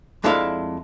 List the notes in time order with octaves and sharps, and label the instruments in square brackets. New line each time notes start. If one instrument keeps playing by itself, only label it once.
[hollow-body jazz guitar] F2 G#3 D4 E4 A4 F5